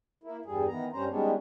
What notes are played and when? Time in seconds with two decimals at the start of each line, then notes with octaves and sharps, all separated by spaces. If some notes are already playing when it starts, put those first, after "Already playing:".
0.24 A#3 E4
0.45 E2 G2 G3 G#4
0.68 D#3 E3 B3 A#5
0.92 G2 G3 C#4 C5 A#5
1.09 D#3 G3 G#3 B3 C#4 D4